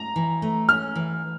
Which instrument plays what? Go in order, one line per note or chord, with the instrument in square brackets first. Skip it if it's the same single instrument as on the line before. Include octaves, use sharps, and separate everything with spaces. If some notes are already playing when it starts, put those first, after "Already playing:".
Already playing: [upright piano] A#5
[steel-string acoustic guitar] E3
A3
[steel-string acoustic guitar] C#4 [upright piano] F6
[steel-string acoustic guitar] E3